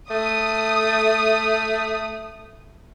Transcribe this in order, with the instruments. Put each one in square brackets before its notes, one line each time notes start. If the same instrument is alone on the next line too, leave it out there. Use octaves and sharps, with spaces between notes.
[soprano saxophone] A3 [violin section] D#6